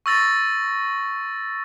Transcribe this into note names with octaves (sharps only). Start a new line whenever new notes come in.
C#6 E6 A6 A#6